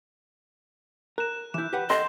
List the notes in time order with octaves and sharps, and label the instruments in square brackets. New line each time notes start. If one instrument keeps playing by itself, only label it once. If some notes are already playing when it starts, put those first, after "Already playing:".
[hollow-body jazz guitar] A#4 [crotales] F#6 E7
[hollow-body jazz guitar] E3 E4 [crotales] G6 E7
[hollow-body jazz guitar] G4 B4 F#5
[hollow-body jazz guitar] A4 [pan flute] D#5 [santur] C6